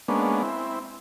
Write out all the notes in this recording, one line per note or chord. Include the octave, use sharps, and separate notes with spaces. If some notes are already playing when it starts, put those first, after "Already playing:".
G#3 A#3 B3 C#4 D4
C4 E4